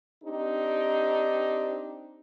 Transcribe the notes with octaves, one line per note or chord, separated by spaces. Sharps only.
C4 D4 D#4 G4